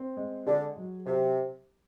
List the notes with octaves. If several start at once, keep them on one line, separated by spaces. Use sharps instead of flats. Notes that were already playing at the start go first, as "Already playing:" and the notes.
Already playing: C4
G#3
D3 G#4
F#3
C3 G4